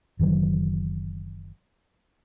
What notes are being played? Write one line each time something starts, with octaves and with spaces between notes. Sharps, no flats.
F#1 D#3 E3 F#3